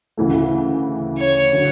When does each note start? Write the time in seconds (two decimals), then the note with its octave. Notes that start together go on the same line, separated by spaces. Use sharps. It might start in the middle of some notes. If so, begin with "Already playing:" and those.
0.17 D2 C#3 E3 A3
1.18 C#5
1.53 D3 F#3